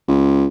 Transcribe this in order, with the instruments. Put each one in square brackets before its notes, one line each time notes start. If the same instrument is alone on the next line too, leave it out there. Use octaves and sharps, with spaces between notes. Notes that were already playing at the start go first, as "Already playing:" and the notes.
[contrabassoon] C#2